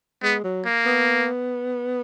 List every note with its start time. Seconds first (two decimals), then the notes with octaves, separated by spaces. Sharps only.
0.22 G#3 B3
0.44 F#3
0.65 A#3
0.86 B3